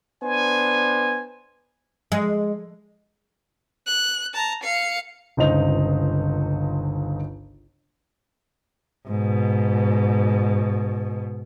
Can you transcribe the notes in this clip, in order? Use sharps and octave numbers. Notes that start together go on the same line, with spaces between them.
B3 D4 C5 G#5
G#3
F#6
A5 A#5
F5 C#7
G1 C#2 D#4 C5 D#5 F7
G#2 B2